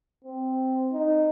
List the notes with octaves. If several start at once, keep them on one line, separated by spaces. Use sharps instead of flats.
C4
D#4